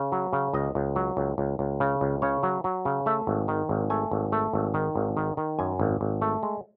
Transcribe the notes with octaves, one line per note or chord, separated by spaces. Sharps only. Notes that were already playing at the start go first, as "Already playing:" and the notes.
Already playing: C#3
F#3
C#3
C#2 D#5
C#2
F#3
C#2
C#2
C#2
C#3
C#2
C#3 C#5
F#3
F#3
C#3
A3 E5
G#1
D#3
G#1
A3 G#5
G#1
A3
G#1
D#3
G#1
D#3
D#3
F#2 G#5
G#1
G#1
A3
G#3